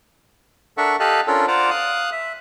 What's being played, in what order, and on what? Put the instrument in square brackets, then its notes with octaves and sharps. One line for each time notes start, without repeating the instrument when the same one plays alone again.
[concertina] D4 A4 A#4 E5 F#5 C#6
G4 A4 D#5 F5 A5 F#6
C#4 D4 F4 A4 A#4
F4 C5 D5 F#5 A#5 D6
F5 D#6 F#6
E5